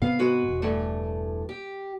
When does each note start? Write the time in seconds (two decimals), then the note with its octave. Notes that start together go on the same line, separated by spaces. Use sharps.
0.02 G#2 C3 B3 F5
0.19 G#3 F#4 B4
0.48 E1
0.62 G2 E3 A3
1.49 G4